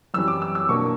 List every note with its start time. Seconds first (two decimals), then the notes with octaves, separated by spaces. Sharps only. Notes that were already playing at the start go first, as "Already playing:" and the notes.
0.14 F#2 E3 G3 C#4 E6
0.28 D6
0.42 E6
0.55 E6
0.69 B2 A#3 D4 C#6